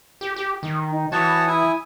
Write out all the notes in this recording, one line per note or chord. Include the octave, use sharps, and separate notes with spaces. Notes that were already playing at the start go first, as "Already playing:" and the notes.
G4
G4
D#3
D#4
E3 F#4 C#5 A5 D#6
E4 G#5